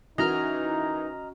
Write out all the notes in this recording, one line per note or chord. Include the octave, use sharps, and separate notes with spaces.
E3 C#4 D#4 F#4 A#4 D#5 A#5 F6